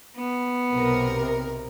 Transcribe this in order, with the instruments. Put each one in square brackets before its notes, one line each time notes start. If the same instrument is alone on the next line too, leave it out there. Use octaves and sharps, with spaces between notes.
[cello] B3
[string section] B1 C3 A#4